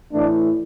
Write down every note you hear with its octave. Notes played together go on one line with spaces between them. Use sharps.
A2 E3 A3 D4